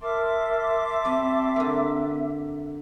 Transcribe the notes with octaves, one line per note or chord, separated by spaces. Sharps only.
A#4 E5 A5 C6 D6
G3 C4 C#4
D3 A#3